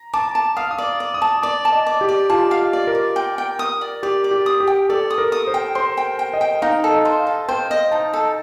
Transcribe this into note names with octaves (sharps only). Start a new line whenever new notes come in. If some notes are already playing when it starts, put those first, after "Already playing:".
Already playing: A#5
A5 D6
A5
F5 D#6
D#6
D5
D5
D#6
A5
D5 D6
A5
D#5
D5
G4
D5
F4 A5
F5
D5
A#4
D5
G5
G5
D#6
D5
G4 D5
D5
G4
D#6
G4
G5
A4 D5
D#6
A#4
D#6
C5
G5
C5 C6
G5
G5
D#5
G5
D#4 F5
A4
D#5
C5
F5
A4
C5 G5
D#5
D#4 A5
A4